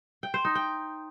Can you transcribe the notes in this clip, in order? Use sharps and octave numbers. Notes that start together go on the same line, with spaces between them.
G5
C5
D#4
G5